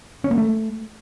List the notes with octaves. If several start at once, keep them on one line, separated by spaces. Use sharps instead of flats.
C#4
A#3
A3